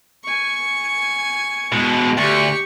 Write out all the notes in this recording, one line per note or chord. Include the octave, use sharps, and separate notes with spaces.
G#5 C#6
B2 G#3
D2 G4 C#6